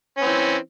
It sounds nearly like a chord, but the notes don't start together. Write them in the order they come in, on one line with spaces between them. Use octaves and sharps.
C#4 C4 E3